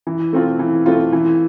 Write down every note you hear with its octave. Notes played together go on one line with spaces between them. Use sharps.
E3
A3 C4 F4
E3
A3 C4 F4
E3